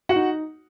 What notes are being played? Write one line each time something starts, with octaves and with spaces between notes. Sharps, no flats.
F#4 F#5
D#4